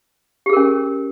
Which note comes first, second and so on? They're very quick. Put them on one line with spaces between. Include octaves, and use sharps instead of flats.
G4 G#4 A#4 C#4